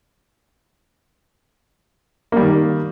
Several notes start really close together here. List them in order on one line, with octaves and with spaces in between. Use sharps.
A#3 G3 D#3